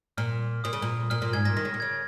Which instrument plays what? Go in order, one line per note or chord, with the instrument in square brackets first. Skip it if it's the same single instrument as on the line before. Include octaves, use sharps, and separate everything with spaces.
[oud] A#2 [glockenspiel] F6
[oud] A#2 [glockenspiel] D#6
[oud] C#3
A#2
[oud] A#2 [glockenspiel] F6
[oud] A#2 [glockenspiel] F6
[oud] G#2 [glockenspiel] G#6
[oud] A#2 [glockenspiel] A#6
[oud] D#3 [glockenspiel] A#6
[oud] C#3
A#2
[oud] C#3 [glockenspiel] G#6